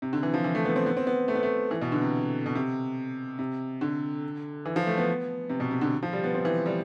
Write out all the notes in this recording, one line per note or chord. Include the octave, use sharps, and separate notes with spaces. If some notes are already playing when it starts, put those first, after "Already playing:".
C3
D3
E3
F3
E3
A3
B3
C4
B3
C4
B3
A3
B3
A3
E3
B2
D3
C3
B2
C3
C3
D3
E3
F3
A3
B3
C3
B2
C3
D3
F3
G3
B3
C4
E3
G3